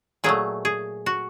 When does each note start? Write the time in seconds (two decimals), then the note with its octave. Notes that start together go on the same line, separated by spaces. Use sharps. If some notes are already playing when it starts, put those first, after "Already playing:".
0.24 A#2 F#3 A3 G#4
0.65 G#4
1.06 F#4